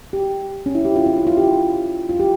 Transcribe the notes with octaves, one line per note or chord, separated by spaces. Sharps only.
G4
C#4
E4
G4
F4
C#4
E4
F4
G4
F4
G4